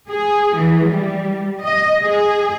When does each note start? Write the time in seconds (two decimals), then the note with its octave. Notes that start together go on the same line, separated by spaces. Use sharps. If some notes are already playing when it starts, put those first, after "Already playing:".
0.10 G#4
0.57 E3
0.87 G3
1.64 D#5
2.05 G#4